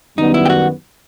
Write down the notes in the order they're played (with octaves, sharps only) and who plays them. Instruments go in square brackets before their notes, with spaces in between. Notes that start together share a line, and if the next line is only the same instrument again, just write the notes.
[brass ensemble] F#2 D#3 G3 B3 [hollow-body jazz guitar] D#4
[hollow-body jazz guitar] E4
G4
F#4